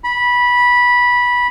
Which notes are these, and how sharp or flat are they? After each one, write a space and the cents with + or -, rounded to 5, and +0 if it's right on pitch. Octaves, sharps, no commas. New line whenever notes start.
B5 -15